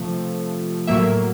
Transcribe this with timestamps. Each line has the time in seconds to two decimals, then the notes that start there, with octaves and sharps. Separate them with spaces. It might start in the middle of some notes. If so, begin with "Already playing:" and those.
Already playing: C3 F3 A3
0.87 A2 F#3 A#3 E5